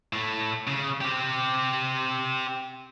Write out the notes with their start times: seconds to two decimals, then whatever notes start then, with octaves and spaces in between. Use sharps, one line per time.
0.13 A2 A3
0.67 C#3
1.01 C4 G4